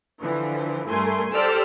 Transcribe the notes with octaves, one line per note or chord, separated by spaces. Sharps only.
D3 E3 F3
G2 A3 A#4 G#5 C6
G4 A4 C5 D5 E6 F6